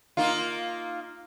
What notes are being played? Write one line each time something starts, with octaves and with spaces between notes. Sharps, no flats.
A#3 D#4 F4